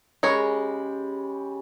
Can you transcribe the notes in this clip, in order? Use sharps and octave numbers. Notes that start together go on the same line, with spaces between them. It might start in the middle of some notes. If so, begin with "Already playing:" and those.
C#3 G#3 G4 A#4 C#5 B5